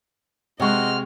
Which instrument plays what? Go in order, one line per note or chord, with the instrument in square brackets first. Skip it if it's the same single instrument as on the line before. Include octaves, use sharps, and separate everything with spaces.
[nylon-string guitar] C3 G#3 [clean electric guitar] C4 F#4 [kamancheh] D#5 F6